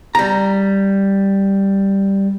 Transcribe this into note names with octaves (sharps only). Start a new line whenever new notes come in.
G3 A#5